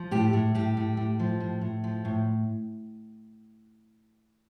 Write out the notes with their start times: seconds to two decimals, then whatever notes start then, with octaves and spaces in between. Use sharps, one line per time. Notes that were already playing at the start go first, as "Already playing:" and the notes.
Already playing: F3
0.11 A2 G4
0.33 A2
0.55 A2 G4
0.77 A2
0.97 A2
1.20 F3
1.40 A2
1.61 A2
1.84 F3
2.05 A2